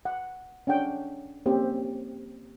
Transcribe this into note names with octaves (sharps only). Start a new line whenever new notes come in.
F#5
C#4 D4 F#5 G5
A#3 C4 C#4 G4